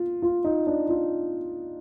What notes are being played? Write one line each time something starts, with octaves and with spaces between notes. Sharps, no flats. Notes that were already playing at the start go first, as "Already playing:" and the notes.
Already playing: F4
F4
D#4
D4
F4